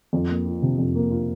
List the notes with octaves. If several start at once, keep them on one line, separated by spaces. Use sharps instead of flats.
F2
A#3
F4
C3
F2
A#3
F4